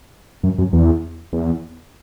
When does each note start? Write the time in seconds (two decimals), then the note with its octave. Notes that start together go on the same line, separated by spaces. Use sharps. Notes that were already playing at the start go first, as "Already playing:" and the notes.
0.43 F#2
0.58 F#2
0.73 E2
1.33 E2